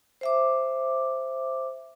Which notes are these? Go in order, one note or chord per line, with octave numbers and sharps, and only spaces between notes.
C5 E5 D6